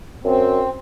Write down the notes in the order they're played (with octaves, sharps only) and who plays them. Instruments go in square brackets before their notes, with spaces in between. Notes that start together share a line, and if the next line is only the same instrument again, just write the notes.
[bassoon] F#2 [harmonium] C4